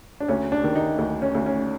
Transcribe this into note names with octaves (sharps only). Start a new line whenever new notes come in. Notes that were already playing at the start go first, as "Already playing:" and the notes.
D4
D2 C#4
D4
D#3
D#4
D2
C#4
D2
C#4